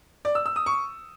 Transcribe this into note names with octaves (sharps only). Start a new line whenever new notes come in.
D5
E6
E6
D#6
C#6